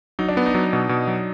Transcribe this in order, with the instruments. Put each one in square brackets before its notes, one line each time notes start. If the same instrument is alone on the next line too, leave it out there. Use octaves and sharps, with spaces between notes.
[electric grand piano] F#3 [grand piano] D#4
[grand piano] D4
[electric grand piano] B3
[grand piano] D#4
[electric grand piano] F#3
B2
B2
F#3